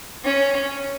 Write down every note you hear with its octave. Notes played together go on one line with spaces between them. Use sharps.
C#4